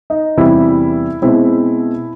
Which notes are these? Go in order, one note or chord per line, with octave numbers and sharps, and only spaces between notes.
D#4
E2 C3 E3 G3 C4 E4
B2 G#3 C4 E4